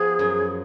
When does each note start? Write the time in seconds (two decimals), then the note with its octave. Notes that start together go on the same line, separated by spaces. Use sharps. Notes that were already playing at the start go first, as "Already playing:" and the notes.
Already playing: F3 B3 G#4
0.19 F#2